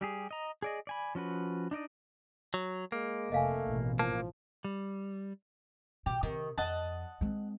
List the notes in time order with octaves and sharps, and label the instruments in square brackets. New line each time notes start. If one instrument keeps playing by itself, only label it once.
[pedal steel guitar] G3 G4 G#4
D#5 A#5
G#4 D5 D#5
D5 G#5 B5
F3 C#4 F#4 B4
D4 D#4 D5 D#5
[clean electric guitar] F#3
[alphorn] G#3 [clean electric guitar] A#3
[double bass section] F1 [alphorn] A3 [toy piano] D#5 F5 G#5
[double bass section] A1 B2
[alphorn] F3 [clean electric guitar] A#3 [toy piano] A5
[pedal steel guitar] G3
[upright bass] B2 [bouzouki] G4
[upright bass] C3 [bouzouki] D#3
[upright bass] F2 [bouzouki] D#5 F#5 A5
[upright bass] G#3 C4